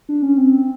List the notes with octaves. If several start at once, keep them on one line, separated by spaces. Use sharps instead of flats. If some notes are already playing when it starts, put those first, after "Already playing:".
D4
C#4
C4